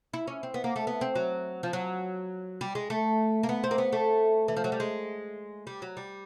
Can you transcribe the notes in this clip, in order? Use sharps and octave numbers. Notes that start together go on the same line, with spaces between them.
E4
C#4
C4
B3
A#3
A3
B3
C4
F#3
F3
F#3
G3
G#3
A3
A#3
B3
C4
A#3
B3
A3
E3
F3
F#3
G3
G#3
G3
F#3
G3